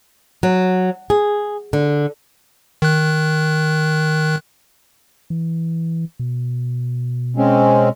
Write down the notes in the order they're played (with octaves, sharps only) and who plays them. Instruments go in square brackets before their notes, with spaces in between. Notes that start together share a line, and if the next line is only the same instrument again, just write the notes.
[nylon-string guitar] F#3
G#4
D3
[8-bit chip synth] D#3 F#6
[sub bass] E3
B2
[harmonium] G#3 C4 C#4